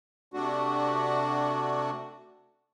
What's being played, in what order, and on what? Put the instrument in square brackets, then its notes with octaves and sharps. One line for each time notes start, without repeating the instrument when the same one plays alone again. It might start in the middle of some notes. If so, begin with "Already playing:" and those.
[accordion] C3 A3 D4 F#4